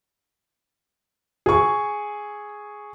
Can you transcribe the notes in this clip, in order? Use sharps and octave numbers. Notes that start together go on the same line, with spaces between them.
G#4 C#6